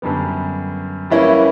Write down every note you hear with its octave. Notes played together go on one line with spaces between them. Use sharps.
F#2 D3 G3 B3
E3 G3 A#3 C#4 E4